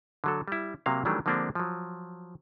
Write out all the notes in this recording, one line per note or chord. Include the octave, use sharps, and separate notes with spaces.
D3 F#3 A4
G3 E4
C3 F#3 A#3 F5
D#3 E3 F#3 G3 A3 D4
D3 F3 G#3 A#3 C4 D4
F3 F#3